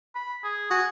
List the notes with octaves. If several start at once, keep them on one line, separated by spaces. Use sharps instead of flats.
B5
G#4
F#4 G#5